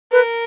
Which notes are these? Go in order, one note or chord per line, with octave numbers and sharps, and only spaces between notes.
A#4 B4